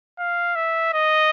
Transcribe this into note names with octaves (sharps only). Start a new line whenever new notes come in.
F5
E5
D#5